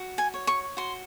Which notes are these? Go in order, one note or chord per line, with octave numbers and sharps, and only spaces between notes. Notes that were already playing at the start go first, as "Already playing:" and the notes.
Already playing: F#4
G#5
C#5
C#6
F#4 C6